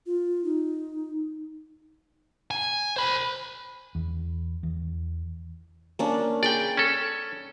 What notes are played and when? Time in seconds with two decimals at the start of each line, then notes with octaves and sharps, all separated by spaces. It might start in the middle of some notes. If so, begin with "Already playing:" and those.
0.06 F4
0.44 D#4
2.51 G#5
2.96 C5 B5
3.95 E2
4.63 E2
5.99 A#3 C#4 D4
6.43 G#4 D5 G5 B5
6.77 C#4 A4